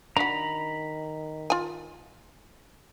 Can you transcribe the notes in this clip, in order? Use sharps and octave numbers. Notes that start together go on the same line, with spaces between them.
D#3 D4 F#4 A#5 B5
F4 G#5